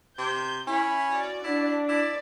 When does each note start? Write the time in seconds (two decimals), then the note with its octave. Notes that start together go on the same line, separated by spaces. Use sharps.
0.18 C3 G6
0.67 C#4 E4 B5
1.09 F#4 D5
1.44 D4 E4
1.89 E4 D5